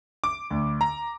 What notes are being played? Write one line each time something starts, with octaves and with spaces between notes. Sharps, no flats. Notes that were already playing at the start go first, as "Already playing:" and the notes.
D6
D2
A#5